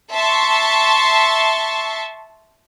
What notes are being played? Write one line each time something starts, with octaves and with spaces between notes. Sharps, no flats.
E5 A5 C6 C#6